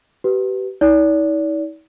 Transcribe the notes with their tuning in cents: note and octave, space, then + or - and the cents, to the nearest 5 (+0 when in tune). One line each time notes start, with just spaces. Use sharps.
G4 -30 B4 +0
D#4 +45 D5 -40